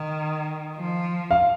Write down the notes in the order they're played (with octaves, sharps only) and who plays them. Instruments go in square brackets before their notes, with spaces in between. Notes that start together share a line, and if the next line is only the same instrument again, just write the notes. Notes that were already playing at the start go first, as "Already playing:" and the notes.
Already playing: [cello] D#3
F3
[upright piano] F5